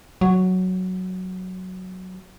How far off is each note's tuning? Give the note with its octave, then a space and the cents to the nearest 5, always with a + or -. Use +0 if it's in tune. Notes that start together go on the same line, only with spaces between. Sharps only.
F#3 +0